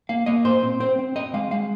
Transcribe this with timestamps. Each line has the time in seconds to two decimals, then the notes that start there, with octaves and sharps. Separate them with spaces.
0.09 A#3 F5
0.26 A#3 D#5
0.44 A#2 C5
0.63 C4
0.80 C4 C5
0.99 C4
1.16 C4 D#5
1.34 G#3 F5
1.51 G#3 F5